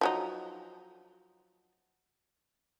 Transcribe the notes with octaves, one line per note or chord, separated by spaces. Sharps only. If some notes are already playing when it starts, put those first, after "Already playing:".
F3 F#3 D#4